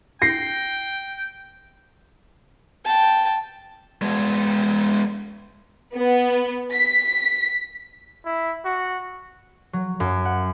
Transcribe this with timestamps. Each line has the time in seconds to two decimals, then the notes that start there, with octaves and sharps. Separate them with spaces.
0.22 G5 A#6 C7
2.85 G5 A5
4.02 G#3 B3
5.96 B3
6.75 B6
8.25 E4
8.65 F#4
9.73 F#3
10.00 F#2
10.25 F#5